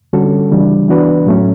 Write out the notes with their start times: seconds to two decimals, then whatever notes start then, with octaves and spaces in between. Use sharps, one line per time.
0.13 D3 G3 C#4 F#4 A4
0.51 C#3 E3 G3 D4
0.89 E3 B3 D4 F#4 B4
1.26 A2 F#3 A3 C#4